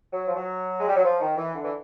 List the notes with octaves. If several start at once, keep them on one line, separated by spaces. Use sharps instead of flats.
F#3
F3
F#3
G#3
G3
F#3
F3
D#3
E3
D3
E3